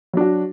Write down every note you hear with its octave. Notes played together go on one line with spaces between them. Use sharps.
F#3 D4 F#4